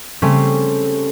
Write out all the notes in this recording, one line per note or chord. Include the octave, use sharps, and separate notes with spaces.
C#3 G3 A3 C4 C#4